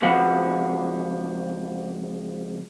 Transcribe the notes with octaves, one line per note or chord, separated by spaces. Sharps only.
C#2 C3 F3 F#4 B4 F#5